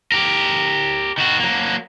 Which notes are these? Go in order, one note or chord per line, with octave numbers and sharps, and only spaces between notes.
G4 A#4
D#3 F#4
F#3 A#3